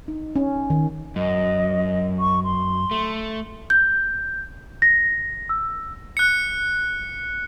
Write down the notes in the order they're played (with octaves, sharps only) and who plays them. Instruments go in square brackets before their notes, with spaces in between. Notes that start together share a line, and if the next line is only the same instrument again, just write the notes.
[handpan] D#4
C#4
D#3
[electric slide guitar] F#2 [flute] D#5
[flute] C#6
C6
[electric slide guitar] A3
[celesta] G6
A#6
E6
[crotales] F#6 C#7